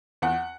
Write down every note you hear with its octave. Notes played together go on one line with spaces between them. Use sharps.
E2 F#5